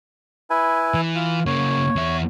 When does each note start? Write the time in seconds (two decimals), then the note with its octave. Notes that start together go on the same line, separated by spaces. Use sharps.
0.50 E4 B4 G#5
0.94 E3
1.15 F4
1.46 C#3 A#3 C#5
1.96 E2 E5